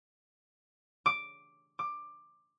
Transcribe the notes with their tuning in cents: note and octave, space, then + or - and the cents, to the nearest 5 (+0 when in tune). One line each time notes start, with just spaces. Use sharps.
D6 +0
D6 +15